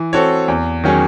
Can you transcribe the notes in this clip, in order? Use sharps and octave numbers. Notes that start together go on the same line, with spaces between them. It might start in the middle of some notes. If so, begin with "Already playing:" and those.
Already playing: E3
C4 F#4 A4 C#5
E2
D#3 F#3 C#4 G#4